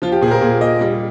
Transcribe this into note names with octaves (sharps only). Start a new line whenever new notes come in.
F3 F4
G4
A#2 G#4
C5
A#4
A#2 G#4
A#3 D#5
G3